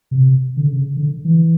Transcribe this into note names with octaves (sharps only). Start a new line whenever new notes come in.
C3
D3
C#3
D3
E3